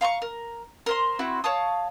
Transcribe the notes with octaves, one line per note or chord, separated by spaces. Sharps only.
F5 A#5 C6 C#6
A#4
A#4 C5 C6
C4 E4 F#4
C#5 F5 A5 D#6